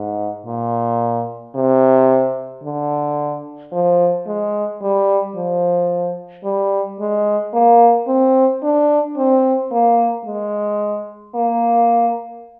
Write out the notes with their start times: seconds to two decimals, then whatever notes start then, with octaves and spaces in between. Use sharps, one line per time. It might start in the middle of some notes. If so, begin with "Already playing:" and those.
Already playing: G#2
0.46 A#2
1.55 C3
2.63 D3
3.72 F3
4.27 G#3
4.82 G3
5.35 F3
6.44 G3
7.00 G#3
7.54 A#3
8.07 C4
8.63 D4
9.17 C4
9.72 A#3
10.25 G#3
11.35 A#3